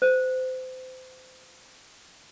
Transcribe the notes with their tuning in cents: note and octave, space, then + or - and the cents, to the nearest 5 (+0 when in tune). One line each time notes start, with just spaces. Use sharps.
C5 -30